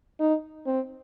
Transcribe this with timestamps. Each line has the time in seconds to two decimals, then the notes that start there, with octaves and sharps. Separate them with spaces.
0.20 D#4
0.66 C4